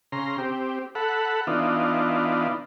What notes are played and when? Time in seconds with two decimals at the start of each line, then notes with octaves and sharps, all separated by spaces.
0.12 C#3 A#5 C6
0.38 C4 G4
0.95 A4 F#5 B5
1.47 E3 B3 D4 D#4 F4